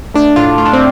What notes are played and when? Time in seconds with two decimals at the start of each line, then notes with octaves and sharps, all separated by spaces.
0.14 A3 D4
0.36 A2 F4
0.58 A3 F4
0.65 D4
0.73 C4